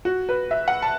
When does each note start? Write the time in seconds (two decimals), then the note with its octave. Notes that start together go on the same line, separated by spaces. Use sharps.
0.05 F#4
0.29 B4
0.51 E5
0.68 F#5
0.82 A5